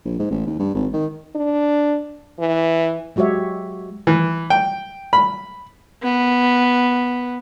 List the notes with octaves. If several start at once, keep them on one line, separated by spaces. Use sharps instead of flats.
A#1
G#2
A1
D#2
G2
G#1
D#3
D4
E3
F#3 G#3 F#4 G4 C#5 E5
E3
G5
B5
B3